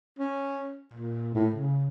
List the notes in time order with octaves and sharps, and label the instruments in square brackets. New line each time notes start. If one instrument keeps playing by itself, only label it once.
[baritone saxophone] C#4
A#2
A2
C#3